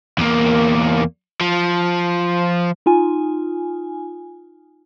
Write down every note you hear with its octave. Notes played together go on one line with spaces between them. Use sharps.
E2 A#3
F3
D#4 F4 G#5